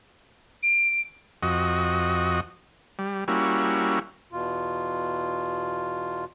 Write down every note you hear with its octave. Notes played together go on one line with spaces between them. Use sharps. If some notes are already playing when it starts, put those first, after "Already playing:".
D7
F2 F#4 D#5
G3
G3 A#3 C#4 E4 F#4
E2 B2 F4